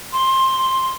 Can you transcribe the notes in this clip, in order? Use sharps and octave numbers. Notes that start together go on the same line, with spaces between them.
C6